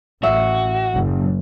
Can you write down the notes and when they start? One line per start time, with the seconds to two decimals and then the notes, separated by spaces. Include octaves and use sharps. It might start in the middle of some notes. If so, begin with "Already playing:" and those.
0.23 A1 F#4 E5
0.95 F#1